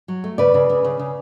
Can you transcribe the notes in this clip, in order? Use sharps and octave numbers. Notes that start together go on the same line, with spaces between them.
F#3
A3
C#3 B4 D5
C#3
C#3
C#3
C#3